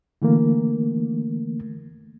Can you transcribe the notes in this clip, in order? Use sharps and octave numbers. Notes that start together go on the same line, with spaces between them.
D3 E3 A3 A#3